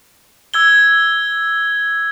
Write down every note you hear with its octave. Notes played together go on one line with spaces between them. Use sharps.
E6 G#6 G7